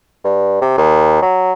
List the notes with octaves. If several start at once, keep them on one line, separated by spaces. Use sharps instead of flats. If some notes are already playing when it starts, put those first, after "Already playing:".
G2
C3
D#2
F#3